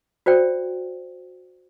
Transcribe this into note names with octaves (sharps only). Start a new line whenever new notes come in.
F#4 C5 D5 G5